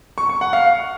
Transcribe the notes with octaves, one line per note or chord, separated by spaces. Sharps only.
C#6
C#6
F#5
F5